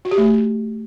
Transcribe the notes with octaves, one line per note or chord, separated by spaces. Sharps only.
F#4
G4
A3